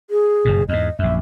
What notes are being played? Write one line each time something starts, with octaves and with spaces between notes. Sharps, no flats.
G#4
F#1 G2 B2
E2 G#2 D#5
A#1 F#2 E5